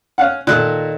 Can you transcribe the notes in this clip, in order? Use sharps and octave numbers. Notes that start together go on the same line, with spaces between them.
C#4 F5 F#5
A#2 D#3 A4 F#6